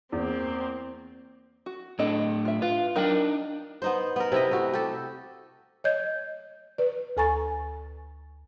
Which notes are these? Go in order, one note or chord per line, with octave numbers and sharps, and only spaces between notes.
E2 A#3 C4
F#4
A2 C4 D4 A4 D#5
F4 E5
F4 B4
F#3 D4 D#4 A#4 G5
B3 D#4 C5
B3 A#4
C3 E4 D#5
A3 F#4
G4 A4
C#5 D#5 G6 G#6
B4 D5
D2 A4 G#5 A#5 C#6 A6